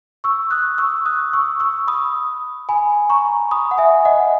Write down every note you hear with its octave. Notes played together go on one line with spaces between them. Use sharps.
C#6 E6
D#6 F#6
C#6 E6
D#6 F#6
C#6 E6
C#6 E6
B5 D#6
G#5 B5
A#5 C#6
B5 D#6
F#5
E5 G#5
D#5 F#5